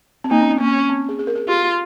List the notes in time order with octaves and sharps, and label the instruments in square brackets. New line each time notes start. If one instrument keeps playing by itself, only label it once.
[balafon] C4
[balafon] A#3 [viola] D#4
[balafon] C#4
C4
[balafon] A#3 [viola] C#4
[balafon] C4
G#4
G#4
A#4
G#4
[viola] F4 [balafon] G4